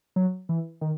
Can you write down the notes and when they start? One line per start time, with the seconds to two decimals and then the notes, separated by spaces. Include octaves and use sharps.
0.16 F#3
0.49 E3
0.81 D#3